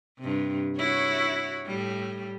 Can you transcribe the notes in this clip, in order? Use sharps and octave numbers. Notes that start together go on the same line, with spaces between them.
G2 C3
E4 F#4 C#5
A2 G3